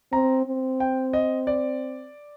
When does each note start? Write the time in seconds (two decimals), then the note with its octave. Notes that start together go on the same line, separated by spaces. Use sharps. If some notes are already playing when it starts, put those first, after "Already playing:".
0.13 C4 A#5
0.47 C4
0.80 G5
1.13 D#5
1.47 D5